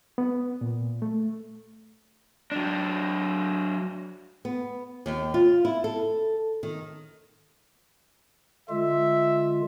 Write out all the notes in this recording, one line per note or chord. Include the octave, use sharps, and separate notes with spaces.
B3
A#2
A3
F#3 D4
B3
D#2
F4
E4
A4
D#3
D3 G#3 F4 E5